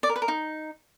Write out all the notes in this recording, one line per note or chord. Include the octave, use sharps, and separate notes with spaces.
D5
A#4
B4
A#4
D#4